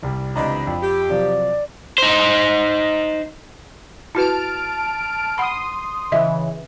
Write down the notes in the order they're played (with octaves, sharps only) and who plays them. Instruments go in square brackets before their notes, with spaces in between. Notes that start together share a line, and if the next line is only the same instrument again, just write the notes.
[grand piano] C2 G3
[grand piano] C#2 D#5 A#5 [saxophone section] C3 E3 D4 [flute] B5
[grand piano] F2
[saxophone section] G4
[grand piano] C3 F3 F#3 [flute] D5
[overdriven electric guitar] D#4 C5
[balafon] E4 F#4 B4 [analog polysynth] A5 F6 D7
[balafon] F#5 B5 [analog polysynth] C6 D#6
[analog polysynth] C#3 E3 [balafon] D#5 E5